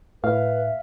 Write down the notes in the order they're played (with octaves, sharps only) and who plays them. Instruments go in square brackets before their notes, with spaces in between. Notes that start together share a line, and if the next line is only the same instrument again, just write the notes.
[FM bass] A2 [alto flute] B4 [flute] E5 [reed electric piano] F5